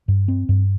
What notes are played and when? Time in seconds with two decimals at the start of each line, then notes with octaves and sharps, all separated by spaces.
0.08 G2
0.28 C4
0.49 G2